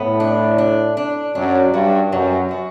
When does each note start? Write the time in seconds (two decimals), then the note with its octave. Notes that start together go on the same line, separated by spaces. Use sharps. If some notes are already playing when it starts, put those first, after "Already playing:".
Already playing: A2 B3
0.20 D4
0.58 D4
0.97 D4
1.35 F#2 D4
1.73 G2 F#4
2.12 F#2 F#3
2.51 F#4